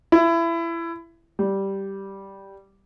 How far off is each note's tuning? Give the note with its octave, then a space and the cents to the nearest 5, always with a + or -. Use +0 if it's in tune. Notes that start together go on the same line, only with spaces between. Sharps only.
E4 +25
G3 -5